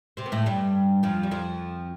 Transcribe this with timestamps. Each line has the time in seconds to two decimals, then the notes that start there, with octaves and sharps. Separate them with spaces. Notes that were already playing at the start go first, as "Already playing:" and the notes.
0.17 C3 C4
0.26 B3
0.32 A2 A3
0.46 G2 G3
1.03 F2 F3
1.23 G3
1.31 F2 F3